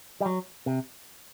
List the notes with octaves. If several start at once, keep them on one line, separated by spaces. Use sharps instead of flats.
G3
F#3
C3